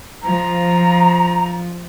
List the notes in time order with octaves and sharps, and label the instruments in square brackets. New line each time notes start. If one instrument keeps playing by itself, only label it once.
[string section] F3 [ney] A#5